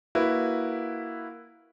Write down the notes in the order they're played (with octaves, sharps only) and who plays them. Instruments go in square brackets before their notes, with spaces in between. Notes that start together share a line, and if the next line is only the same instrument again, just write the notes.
[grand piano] A#3 E4 F#4 B4